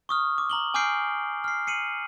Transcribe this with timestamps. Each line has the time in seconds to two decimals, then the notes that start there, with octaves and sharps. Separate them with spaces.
0.09 C#6 D#6 F6
0.38 D6
0.50 A#5 F#7 G7
0.74 G#5 D6 F6 G6 C7 D7
1.44 F6 C7
1.67 C7 C#7 D#7 F#7